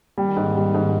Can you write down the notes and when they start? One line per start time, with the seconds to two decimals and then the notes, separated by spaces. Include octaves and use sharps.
0.18 D#3 G3
0.36 G#2
0.55 G3
0.74 G#2